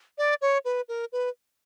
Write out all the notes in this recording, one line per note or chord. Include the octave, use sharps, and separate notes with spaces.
D5
C#5
B4
A#4
B4